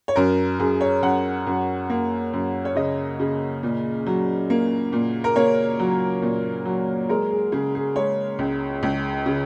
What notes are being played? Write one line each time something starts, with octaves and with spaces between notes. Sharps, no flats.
C#5
F#2 A#4
F#2 G#4
C#5
F#2 F#5
F#2
A#3
F#2
C#5
C#3 D#5
C#3
A#2
F#3
A#3
A#2
A#4
A#3 C#5
F#3
A#2
F#3
G#3 A#4
G#4
C#3 G#4
G#4
G#3 C#5
C#2
C#2
C#3